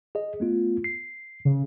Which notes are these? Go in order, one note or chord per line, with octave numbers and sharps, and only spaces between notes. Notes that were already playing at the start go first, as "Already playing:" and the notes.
G#4 D#5
A3 B3 F4
C7
C#3